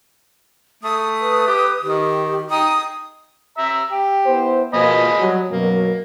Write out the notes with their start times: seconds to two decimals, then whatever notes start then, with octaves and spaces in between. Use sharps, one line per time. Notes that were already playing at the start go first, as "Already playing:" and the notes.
0.83 A3 D#6
1.21 B4
1.47 G4
1.84 D#3 G4
2.50 D#4 G5 D#6
3.58 E5 A#5
3.91 G4
4.26 B3 E4 C5
4.74 B2 F3 A#3 D#5 G#5 B5
5.19 F#3 G3
5.51 F#2 B2 F#3 A#3